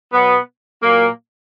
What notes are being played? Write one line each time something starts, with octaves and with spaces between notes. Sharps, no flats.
B2 F#3 B3
A#2 F#3 A#3